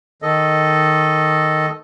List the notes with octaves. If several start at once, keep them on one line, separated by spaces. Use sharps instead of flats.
D#3 A4 D#5